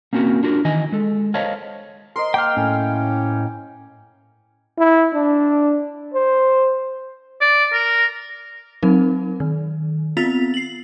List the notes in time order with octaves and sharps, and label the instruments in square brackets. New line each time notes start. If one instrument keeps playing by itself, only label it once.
[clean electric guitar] A#3 C4 C#4 F#4 A#4
D4 F4 F#4 A#4
D#3 E3 D#5 G#5
G#3 A4
A#4 C5 C#5 D#5 F5 A5
[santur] A#4 C5 D#5 [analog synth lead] C6
[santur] A#3 [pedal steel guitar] G5 F6
[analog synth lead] A2 [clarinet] C#4
[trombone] E4
D4
C5
[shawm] D5
A#4
[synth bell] F#3 C4 D#4 A#4
D#3
B3 C4 F4 A6 B6 F7
C7 F#7